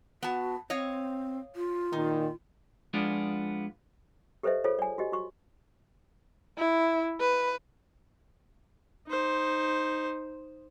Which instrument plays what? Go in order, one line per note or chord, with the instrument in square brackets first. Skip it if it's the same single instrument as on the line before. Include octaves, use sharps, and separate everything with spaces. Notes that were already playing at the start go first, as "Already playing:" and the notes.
[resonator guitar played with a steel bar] B3 A5 [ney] F#4
[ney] C4 [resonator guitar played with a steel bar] C#5 D#5 F5
[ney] F4
[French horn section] A#2 D#3 [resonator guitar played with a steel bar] D#4
[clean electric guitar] F3 G#3 B3 D4 F4
[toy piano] G4 A4 B4 C5 D#5 E5
F4 G#4 A4 C5 C#5
D5 G#5
F#4 G4 D#5
F#4 C#6
[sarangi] E4
B4
[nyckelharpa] D#4 C5